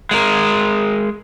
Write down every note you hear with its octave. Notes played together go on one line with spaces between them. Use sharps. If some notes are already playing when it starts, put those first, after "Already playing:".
G#3 A#4